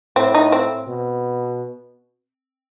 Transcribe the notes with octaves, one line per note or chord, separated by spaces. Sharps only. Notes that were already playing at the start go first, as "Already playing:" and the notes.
A2 C4
D#4
C4
B2